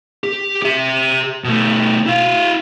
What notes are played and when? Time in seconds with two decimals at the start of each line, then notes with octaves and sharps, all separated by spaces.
0.24 G4
0.62 G4 E5
1.44 B2 A3
2.06 E4 F5